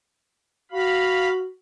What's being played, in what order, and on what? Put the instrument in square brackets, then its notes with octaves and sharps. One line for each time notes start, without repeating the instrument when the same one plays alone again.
[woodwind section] F#4 [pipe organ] F5 B5